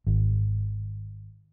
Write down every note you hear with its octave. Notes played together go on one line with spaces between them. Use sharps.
G#1